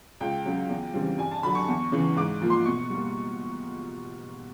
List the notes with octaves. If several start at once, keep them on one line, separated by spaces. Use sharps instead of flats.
C#2 G5
C#3 F#3
E2
C#3 E3 G3 C4
G2 G#5
A5
D3 F#3 B5
C#6
E2
C#3 E3
G#2 D6
F3 A#3
C6
B2 C#6
G3 A#3